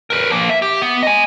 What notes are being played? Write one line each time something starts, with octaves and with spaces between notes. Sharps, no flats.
A#4 B4
F3 A#3
E5
G4
B3
D#5 G#5